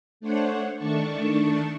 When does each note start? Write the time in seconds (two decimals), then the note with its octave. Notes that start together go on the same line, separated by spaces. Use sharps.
0.20 A3 D4 C5 C#5 F#5
0.76 D#3 A3 D4 A5 C#6